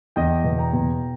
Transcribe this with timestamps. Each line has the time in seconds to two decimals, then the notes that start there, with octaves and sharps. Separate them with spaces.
0.16 E2 D#5 G5
0.44 B2
0.58 G5 A#5
0.73 B2